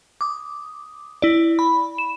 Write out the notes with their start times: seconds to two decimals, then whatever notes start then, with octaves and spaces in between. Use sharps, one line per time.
0.21 D6 D#6
1.22 E4 D5
1.59 B5
1.98 E7